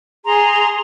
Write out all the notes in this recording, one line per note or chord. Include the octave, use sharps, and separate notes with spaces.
G#4 A#5 C6